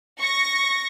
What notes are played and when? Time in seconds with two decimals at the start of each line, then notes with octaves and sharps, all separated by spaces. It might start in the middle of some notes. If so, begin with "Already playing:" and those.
0.18 C#6 A#6